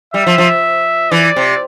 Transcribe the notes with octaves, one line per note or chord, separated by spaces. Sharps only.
G3 E5
F3
F3
E3 D5
C3